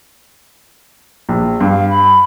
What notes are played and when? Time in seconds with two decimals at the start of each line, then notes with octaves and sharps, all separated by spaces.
1.29 A#1
1.60 G2 F5
1.90 B5